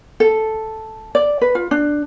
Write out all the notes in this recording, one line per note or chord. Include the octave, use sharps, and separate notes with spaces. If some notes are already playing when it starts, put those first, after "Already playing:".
A4
D5
B4
F4
D4